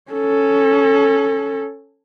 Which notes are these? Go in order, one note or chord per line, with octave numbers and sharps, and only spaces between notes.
C#4 A4